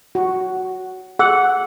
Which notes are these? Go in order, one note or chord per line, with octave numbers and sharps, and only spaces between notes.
F#4
G#4 F#5 E6